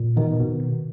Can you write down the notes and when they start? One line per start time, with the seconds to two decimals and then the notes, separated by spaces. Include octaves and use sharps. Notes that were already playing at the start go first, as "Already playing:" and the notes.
Already playing: A#2
0.16 B2 D#3
0.40 B2